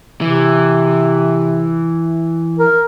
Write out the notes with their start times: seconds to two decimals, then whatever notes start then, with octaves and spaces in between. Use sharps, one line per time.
0.21 C3 E3
2.59 A#4